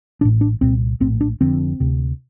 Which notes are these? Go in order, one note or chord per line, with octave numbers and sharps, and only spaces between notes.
A1 A2 D4
D4
C2 A#2 C4
A#1 A2 C4
D4
F1 F2 D3 C4
D2 C3